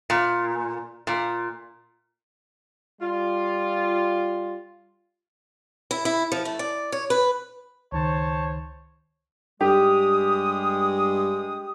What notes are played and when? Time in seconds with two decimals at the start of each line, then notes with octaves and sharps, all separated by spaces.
0.10 A#2
1.07 A#2
3.02 G3 F4
5.91 E4
6.05 E4
6.32 F3
6.45 A3
6.59 D5
6.92 C#5
7.10 B4
7.92 C#2 D#3 C5 C#5 A5 C#6
9.61 G2 G#3 G4 D#6